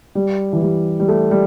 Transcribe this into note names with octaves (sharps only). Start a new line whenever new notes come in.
G3
E3
G3
G3
A3
G3